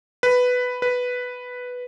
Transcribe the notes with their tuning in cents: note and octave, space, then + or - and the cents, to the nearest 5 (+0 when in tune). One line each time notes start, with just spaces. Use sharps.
B4 +5
B4 +0